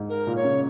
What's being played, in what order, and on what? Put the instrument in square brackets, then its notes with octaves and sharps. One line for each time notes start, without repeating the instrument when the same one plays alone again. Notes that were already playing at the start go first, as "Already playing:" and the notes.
Already playing: [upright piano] G#2
[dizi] A#4
[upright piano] A#2
[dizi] C#5
[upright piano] C#3